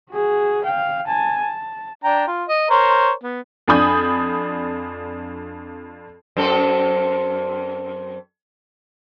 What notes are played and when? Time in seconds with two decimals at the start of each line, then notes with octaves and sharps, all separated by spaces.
0.11 F#4 G#4
0.64 F5 G5
1.06 G#5 A5
1.41 A5
2.04 D4 G5 A#5
2.28 F4
2.48 D#5
2.70 A#4 C5 C#5
3.23 B3
3.67 F2 D4 G#5 B5 D#6 G6
6.37 F#2 C4 A4